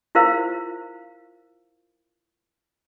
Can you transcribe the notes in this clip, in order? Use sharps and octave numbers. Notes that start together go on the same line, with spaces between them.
E4 F4 A#4 C5 F5